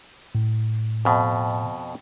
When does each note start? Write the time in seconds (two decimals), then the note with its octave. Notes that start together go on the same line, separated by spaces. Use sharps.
0.35 A2
1.05 F2 B2